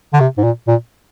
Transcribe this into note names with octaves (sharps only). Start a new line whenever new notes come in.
D3
C3
G#2
A#2
A#2